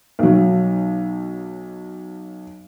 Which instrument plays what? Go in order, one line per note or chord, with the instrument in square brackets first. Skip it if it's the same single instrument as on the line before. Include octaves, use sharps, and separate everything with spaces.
[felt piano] B1 F#3